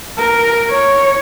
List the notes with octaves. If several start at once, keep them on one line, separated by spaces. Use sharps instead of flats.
A#4
C#5